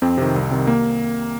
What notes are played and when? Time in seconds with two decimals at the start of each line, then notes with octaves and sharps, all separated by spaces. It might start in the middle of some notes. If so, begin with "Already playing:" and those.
0.02 F2 C4
0.18 C3 D#3
0.35 C2
0.51 C3 D#3
0.67 A#3